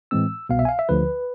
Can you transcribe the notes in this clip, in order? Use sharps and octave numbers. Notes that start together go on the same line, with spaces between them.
A2 E3 G#3 C4 E6
C2 B2 B3 F5
E5
G#5
F5
E5
D2 D3 F3 B4